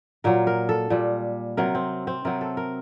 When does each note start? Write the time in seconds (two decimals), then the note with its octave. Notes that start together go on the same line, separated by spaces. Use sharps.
0.24 A#2 F#3 A#4
0.47 A#4
0.69 A4
0.90 A#2 G3
1.57 C3 F#3 A#4
1.75 C4
2.07 C4
2.25 C3 F#3 A#4
2.41 A4
2.57 A#4